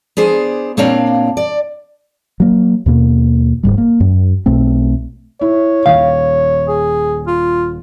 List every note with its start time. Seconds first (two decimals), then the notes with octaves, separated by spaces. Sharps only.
0.17 B3 D4 G#4 C5
0.77 A#2 A#3 C4 D4 C#5 F5
1.37 D5
2.40 F#3 A#3
2.86 D#2 B2 A#3
3.63 D#1 D#2 G#2 G3
3.78 A#3
4.00 F#2
4.46 B1 B2 A3 C4
5.41 E4 C#5
5.86 D#1 F5
6.68 G#4
7.27 F4